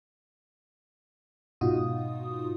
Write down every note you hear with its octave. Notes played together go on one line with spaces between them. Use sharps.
G#2 B2 D#4 F4 F#4 D#6